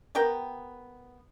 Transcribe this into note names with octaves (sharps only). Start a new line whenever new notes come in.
B3 G4 A#4 G5